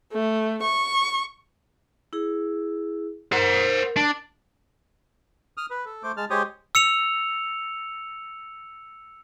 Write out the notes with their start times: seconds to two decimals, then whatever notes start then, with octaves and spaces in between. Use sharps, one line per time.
0.12 A3
0.63 C#6
2.13 E4 G#4
3.32 A#4 C5 F#5
3.97 D4
5.57 D#6 F6
5.71 B4
5.85 A4
6.03 A3 C5 D6
6.17 G#3 A5 F6
6.30 G#3 G4 C5 C#5 D#6
6.75 E6 C#7 F7